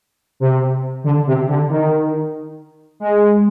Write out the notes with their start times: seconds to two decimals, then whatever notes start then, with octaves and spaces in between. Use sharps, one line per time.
0.40 C3
1.04 D3
1.27 C3
1.48 D3
1.70 D#3
3.00 G#3